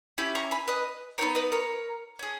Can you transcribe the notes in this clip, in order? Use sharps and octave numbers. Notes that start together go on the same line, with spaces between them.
C#4 E4 G4
A#5 C#6
G#5 B5
B4 D#5
B3 D#4 G4 A#4 C#5
B4 D#5
A#4 C#5
C#4 G#4